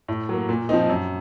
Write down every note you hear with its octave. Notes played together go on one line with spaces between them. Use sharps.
A2
F#3 A#3
A#2
F3 C4 D#4
F#2